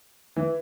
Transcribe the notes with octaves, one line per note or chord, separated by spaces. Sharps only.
E3